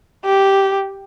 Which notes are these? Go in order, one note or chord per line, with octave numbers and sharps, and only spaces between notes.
G4